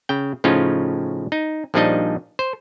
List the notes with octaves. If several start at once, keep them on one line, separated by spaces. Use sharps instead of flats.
C#3 G5
A2 C#3 F3 C#4 D#4 F4
D#4
A#1 F3 G3 D4 D#4 D#5
C5